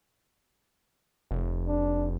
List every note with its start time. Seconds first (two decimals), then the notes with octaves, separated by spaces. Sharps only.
1.31 F1
1.67 D4